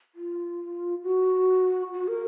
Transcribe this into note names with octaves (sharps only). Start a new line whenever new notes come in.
F4
F#4
F#4
A#4